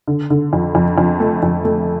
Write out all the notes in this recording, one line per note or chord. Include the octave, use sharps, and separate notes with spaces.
D3
D3
F2
F2
F2
A3
F2
A3